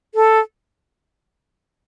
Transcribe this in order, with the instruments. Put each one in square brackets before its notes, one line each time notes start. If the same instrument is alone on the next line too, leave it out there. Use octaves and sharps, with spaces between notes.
[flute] A4